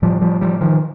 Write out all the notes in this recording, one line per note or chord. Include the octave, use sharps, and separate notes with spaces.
A2 F3 G3
F3 G3
F3 G3
D#3 F3